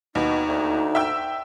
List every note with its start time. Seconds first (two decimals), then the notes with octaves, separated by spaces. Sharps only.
0.15 D#2 B2 D#4
0.48 D2
0.95 E5 G5 E6